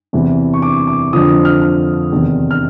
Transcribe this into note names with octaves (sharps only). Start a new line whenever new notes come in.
E2 C3 E3
C#6
D6
D6
F2 D3 F3 D#6
F6
F6
E2 C3 D#3
F6